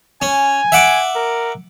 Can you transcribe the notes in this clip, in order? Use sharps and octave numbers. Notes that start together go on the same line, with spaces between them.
C#4 G#5
E5 F#5 D6
A#4